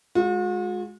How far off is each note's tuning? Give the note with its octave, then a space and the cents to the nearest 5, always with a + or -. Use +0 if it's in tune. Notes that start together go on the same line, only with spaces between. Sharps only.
G#3 +10 F#4 -45